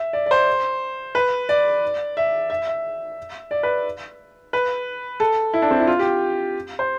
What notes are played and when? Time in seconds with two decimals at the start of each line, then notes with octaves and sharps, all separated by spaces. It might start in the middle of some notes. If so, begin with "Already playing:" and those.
Already playing: E5
0.13 D5
0.26 D5
0.31 C5
1.15 B4
1.49 D5
2.17 E5
2.50 E5
2.67 E5
3.51 D5
3.63 B4
4.53 B4
5.20 A4
5.54 E4
5.62 D4
5.71 C4
5.80 E4
5.87 F4
5.99 G4
6.79 C5